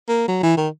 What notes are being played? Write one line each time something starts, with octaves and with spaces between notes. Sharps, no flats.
A#3
F#3
E3
D#3